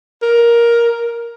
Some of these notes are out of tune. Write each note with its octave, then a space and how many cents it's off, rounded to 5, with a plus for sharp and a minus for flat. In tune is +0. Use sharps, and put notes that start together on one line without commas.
A#4 +10